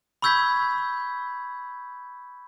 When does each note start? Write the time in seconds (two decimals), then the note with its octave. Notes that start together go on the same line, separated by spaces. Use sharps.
0.22 B5 C#6 E6 G6 G#6 B6